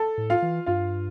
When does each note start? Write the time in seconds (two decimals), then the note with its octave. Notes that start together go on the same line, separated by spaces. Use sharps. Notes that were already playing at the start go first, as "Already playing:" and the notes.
Already playing: A4 A5
0.18 A2
0.30 F4 F5
0.42 E3
0.66 G2 F4 F5